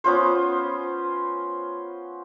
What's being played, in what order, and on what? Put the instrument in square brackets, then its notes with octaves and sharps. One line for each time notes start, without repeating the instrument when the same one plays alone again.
[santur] B3 C#4 F4 C5